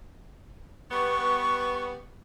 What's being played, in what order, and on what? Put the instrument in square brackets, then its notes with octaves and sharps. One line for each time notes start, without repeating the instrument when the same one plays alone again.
[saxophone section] G3 B3 [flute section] C#6